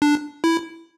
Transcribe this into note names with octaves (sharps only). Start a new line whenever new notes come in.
D4
E4